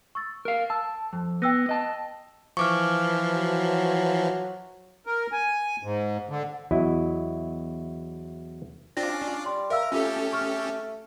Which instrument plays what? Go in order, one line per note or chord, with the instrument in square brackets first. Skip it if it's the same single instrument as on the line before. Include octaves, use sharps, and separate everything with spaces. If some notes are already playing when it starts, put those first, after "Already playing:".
[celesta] C#6 E6 A6
[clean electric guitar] A#4 F5
[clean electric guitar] A5 [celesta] E6
[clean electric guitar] F2
[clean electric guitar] B3 [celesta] G5 E6 A#6
[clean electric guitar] D#5 A5
[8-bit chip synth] E3 F3 [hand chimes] C#6 D6 F6
[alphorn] F#3
[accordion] A#4
G#5
G#2
D3
[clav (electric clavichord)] E2 F#3 E4 D#5
[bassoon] C4 [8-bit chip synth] D4 F4 D5 [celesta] A#6
[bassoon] C#4
[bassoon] G3 [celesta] C6
[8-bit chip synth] A#4 [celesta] E5 F5 E6
[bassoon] A3 [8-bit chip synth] C#4 G4 A4 [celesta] F4
[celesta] C#6 F6